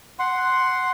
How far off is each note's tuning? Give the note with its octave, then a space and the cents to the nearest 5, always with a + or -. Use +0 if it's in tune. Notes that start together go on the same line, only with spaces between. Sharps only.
F#5 +0 C6 +0